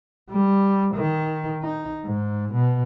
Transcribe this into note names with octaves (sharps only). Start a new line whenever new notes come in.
G3
D#3
D#4
G#2
B2